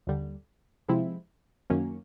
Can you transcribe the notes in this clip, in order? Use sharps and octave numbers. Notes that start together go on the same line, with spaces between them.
D#2 D3 G3
C3 F3 G#3 C4 E4
F#2 D#3 F#3 A#3 C#4